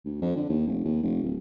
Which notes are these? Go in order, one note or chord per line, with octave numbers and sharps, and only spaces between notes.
D2
F2
D3
D#2
F1
D#2
F1
D1